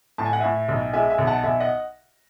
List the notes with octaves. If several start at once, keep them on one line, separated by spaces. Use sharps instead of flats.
A2 A5
G#5
F#5
A2 E5 G#5
B1
G#3 E5 G#5
E5 G#5
B1
F#5 A5
B1 E5 G#5
D#5 F#5